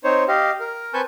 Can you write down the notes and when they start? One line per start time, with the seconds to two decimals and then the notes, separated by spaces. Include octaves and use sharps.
0.04 C4 D#4 C5 C#5
0.28 G4 D#5 F5
0.60 A#4
0.94 C4 B4 G#5 A5 C#6 G6